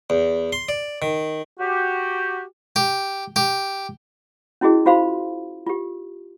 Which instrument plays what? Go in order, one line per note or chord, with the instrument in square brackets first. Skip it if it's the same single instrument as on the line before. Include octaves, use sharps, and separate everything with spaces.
[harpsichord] E2
C6
D5
D#3
[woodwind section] F#4 G4
[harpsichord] G4
G4
[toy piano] C#4 E4 F#4 G#4 D#5
F4 F#4 C5 F5 B5 C6
F4 G4